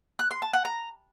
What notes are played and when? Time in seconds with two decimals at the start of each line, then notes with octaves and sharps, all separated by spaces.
0.19 F#6
0.31 C6
0.42 A5
0.53 F#5
0.65 A#5